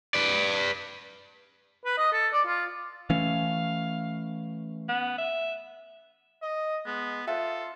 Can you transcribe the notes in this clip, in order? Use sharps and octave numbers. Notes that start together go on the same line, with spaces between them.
B4 D5
B4
D#5
A4
D5
F4
E3 A3 C#4 F5
B3
E5
D#5
G#3 B3
F4 A4 C5 E5 F#5